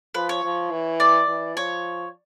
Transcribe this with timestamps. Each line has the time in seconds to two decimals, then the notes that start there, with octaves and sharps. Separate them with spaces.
0.14 F3 B4
0.29 C#5
0.43 F3
0.71 E3
1.00 D5
1.28 E3
1.56 F3 C#5